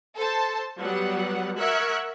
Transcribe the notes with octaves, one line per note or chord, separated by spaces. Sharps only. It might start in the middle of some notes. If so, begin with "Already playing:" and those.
A4 C5 A5
F#3 G3 B3 F#5
A#4 E5 F#5 C#6 F#6 G#6